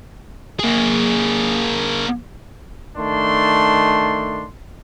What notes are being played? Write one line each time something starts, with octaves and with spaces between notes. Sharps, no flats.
A#3 G#4
D#3 A3 D4 C6